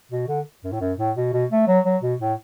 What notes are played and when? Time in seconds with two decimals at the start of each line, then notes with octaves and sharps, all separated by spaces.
0.12 B2
0.28 D3
0.64 F#2
0.72 A2
0.81 F#2
0.98 A2
1.16 B2
1.33 B2
1.51 A3
1.67 F#3
1.85 F#3
2.02 B2
2.21 A2